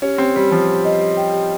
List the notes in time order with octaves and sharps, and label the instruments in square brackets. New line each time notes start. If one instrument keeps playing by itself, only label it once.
[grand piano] C#4 [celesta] G4
[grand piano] C4 [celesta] G4
[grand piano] G3 [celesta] G4
[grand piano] F3 [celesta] G4
[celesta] G4
D#5
G4
G5
G4